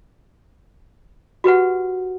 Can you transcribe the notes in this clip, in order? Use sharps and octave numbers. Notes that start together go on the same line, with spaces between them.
F#4 G4 B4 F#5